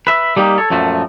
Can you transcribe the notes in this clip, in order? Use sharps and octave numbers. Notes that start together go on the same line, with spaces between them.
B4 E5
G3 A#3 D#4 F4 G4
A4 C#5
F#2 A#2 F3 A3 F#4